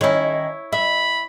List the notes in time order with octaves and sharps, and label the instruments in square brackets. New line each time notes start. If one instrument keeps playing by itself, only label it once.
[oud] D#3 C#4 [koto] E4 C#5
[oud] E5 [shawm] B5